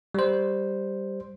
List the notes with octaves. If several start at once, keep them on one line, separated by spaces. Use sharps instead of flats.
G3 C5